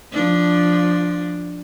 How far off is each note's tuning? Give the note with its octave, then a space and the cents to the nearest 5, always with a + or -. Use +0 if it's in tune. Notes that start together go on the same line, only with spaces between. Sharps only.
F3 +5 D4 +0